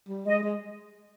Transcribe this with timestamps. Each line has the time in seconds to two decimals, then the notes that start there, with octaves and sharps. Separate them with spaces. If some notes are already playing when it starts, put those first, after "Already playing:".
0.09 G3
0.26 G#3 D#5
0.43 G#3